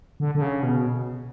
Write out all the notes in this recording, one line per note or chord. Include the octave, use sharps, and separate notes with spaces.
D3
D3
C#3
B2